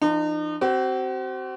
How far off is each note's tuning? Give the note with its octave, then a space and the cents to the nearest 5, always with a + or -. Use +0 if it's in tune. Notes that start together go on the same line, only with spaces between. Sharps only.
E3 +45 D#4 -40
C4 +0 F#4 +40